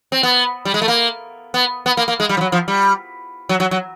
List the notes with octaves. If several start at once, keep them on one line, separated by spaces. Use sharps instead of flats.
C4
B3
G3
G#3
A3
A#3
B3
B3
A#3
A#3
G#3
G3
F3
F#3
F3
G3
F#3
F#3
F#3